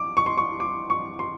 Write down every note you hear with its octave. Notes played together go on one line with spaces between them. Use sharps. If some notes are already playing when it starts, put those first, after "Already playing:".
Already playing: D6
C#6
C6
C#6
D6
C#6
C6